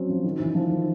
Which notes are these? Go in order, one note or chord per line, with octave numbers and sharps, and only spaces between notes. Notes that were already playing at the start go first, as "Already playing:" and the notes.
Already playing: F#3 C4 C#4
F3
D#3
E3
F3
D#3